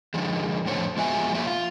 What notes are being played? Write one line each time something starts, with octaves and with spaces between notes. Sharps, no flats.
D3 D#3 F3 G#3
F2 A2 D3 C5 C#5
F3 G#3 B3 F#4 E5 G#5
F2 F3 F#3 A#3 E5
F4